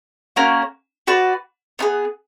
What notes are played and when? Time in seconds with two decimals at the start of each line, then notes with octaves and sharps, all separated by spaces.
0.36 A#3 C#4 F#4 A#4
1.07 F#4 B4 D5
1.79 B3 D#4 G#4